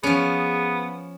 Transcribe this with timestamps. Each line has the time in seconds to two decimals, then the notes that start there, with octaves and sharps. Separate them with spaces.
0.03 F3 B3 C#4 G#4